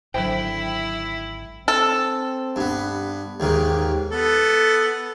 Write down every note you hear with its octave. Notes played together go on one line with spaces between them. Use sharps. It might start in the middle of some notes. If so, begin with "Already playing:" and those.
G#1 D3 F#3 E4 C5 G5
C4 A4
G2 B3
D#2 G#2 D#3 G4
B3 A4